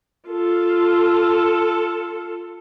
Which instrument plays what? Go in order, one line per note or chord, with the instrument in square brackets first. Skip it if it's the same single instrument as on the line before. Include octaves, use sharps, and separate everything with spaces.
[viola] F4 A4